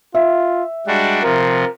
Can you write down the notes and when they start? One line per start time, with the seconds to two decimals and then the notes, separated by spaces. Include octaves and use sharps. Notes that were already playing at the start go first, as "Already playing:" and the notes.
0.15 F4 E5
0.87 G3 G#3 D4 F#4
1.23 C3 F3 A#4